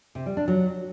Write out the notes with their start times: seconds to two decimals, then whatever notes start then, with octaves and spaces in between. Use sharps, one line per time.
0.15 C3
0.26 G3
0.37 D4
0.48 F#3